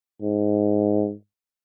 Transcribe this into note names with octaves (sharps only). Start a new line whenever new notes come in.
G#2